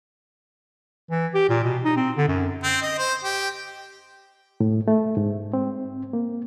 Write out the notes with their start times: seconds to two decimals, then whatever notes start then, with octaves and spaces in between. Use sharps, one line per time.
1.10 E3
1.34 G4
1.49 A#2
1.64 B2
1.84 D#4
1.96 C4
2.16 D3
2.28 F#2
2.63 C4
2.82 D#5
2.98 C5
3.24 G4
4.60 A2
4.88 A3
5.17 G#2
5.53 C4
6.13 A#3